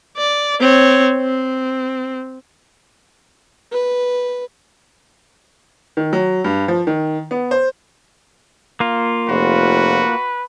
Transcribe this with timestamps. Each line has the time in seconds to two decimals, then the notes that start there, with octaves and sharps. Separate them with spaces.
0.17 D5
0.60 C4 C#5
1.17 C4
3.72 B4
5.97 D#3
6.13 F#3
6.44 G2
6.68 F3
6.87 D#3
7.31 B3
7.51 C5
8.80 A#3 F4
9.28 F1 F#4 B4